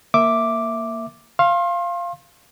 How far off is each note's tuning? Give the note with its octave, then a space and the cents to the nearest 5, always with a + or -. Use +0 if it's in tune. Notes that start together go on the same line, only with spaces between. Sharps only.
A#3 -10 E5 +0 D6 +0
F5 -10 C6 +35